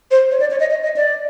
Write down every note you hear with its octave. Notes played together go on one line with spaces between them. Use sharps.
C5
C#5
D5
C#5
D#5
D#5
D#5
D5